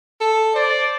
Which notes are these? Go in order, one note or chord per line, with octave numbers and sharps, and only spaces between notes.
A4
C5 D5